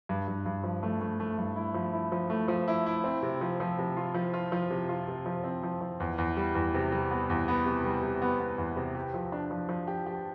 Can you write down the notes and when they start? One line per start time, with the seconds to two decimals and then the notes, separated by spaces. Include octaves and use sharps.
0.09 G2
0.28 G2
0.46 G2
0.64 F3
0.83 A3
1.01 A3
1.20 A3
1.38 G2
1.56 E4
1.74 F3
1.93 E4
2.12 F3
2.30 A3
2.48 F3
2.68 E4
2.86 E4
3.04 C4
3.23 C3
3.41 F3
3.60 F3
3.78 C3
3.97 F4
4.14 F3
4.34 F4
4.52 F3
4.70 C3
4.89 F4
5.08 C3
5.26 F3
5.44 C4
5.63 F3
5.81 F3
6.00 E2
6.18 E2
6.37 G3
6.55 E2
6.74 C3
6.92 G3
7.11 B3
7.30 E2
7.48 B3
7.66 C3
7.84 G3
8.03 C3
8.22 B3
8.40 B3
8.58 E2
8.76 C3
8.95 G4
9.14 F3
9.32 D4
9.51 F3
9.69 F3
9.88 G4
10.06 G4